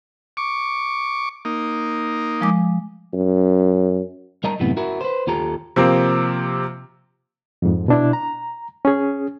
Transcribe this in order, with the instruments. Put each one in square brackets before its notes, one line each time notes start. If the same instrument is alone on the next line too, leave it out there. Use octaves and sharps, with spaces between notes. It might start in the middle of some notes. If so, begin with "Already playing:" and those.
[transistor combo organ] C#6 D6
A#3 D#4
[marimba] F3 G#3 D6
[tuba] F#2
[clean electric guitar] G3 A#4 D#5 A5 A#5
F#2 A2 C3 E3 B3
E4 F#4 A#4
B4 C5
D#2 F4 G4 A4 A#5
[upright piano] C3 F3 A#3 C4
[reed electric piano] F2 G#2
B2 D4 E4
A#5
C#4 G#4